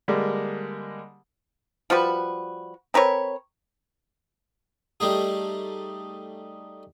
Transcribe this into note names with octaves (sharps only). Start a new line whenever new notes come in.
D3 G3 G#3 A#3
F3 G3 F#4 B4
C4 A#4 B4 C#5
G3 A3 D#4 G#4